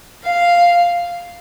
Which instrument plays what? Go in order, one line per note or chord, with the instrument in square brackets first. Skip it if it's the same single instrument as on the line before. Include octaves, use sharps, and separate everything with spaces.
[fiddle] F5